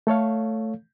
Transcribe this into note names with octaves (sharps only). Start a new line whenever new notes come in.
A3 A4 C#5 F5